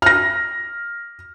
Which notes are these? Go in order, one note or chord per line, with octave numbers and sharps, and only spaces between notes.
F6 A#6